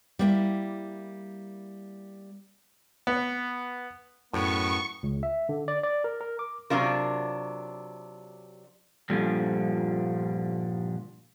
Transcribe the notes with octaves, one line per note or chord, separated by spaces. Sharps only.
G3 A#3 E4
B3
F#2 A2 B3 C#6
C#2
E5
D3
D5
D5
A#4
A#4
D6
C3 F#3 D4 F4 A#4
G2 A#2 D3 F3 G3